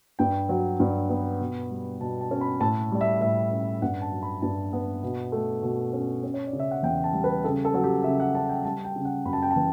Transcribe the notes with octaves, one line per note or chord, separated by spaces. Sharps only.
G2 G5
F#3
G2
B3
B2
G3
B2 A5
A5
C#4
B5
A2 A5
G3 D5
E5
A2 E5
C#4
G2 F#5
A5
F#3
B5
G2 A5
B3
B2
A3
B2
C#4
C#4
C#5
D5
C#3
E5
F#5
E2 G5
A5
G3
B4
C#3 A4
A4
F#3
G4
C#3 E5
F#5
C#4 A5
G5
G3 A5
G5
C#3
F#5
F#2 B5
A5
G5
A5
E3